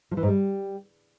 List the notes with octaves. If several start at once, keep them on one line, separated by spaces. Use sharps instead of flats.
F3
E3
G#2
G3